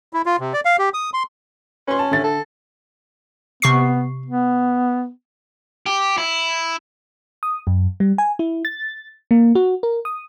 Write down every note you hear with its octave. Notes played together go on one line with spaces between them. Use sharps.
E4
F4
C3
D5
F5
G4
D#6
C6
C#4 B4 C6
A5
D3 E5 A6
A4
C3 B3 C#6 C7
B3
G4
E4
D#6
F#2
G3
G#5
E4
A6
A#3
F#4
A#4
D#6